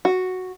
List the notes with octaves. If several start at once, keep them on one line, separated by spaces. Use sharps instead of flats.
F#4